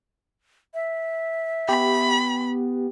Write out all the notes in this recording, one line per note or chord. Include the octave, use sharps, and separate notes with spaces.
E5
B3 G4 B5